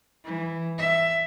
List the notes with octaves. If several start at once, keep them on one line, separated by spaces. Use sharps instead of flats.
E3
E5